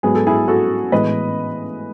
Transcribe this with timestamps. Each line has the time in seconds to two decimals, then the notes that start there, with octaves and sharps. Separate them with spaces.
0.03 G#2 F#3 B3 G#4
0.15 A4
0.27 E4 G#4
0.48 F#4 A4
0.92 A2 E3 G#3 B3 B4 D#5